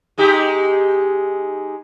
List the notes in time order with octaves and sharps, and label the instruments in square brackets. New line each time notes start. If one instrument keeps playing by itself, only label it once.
[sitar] G#3 D#4 G4